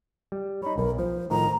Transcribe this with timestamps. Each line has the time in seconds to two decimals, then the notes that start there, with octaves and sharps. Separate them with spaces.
0.32 G3
0.62 D#4 C#5 B5
0.78 B1 A#4
0.98 F3 C5
1.30 A2 D#3 F3 A#5